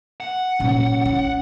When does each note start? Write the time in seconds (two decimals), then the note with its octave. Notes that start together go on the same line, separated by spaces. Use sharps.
0.20 F#5
0.60 A#2 F#3 C#4
1.05 E4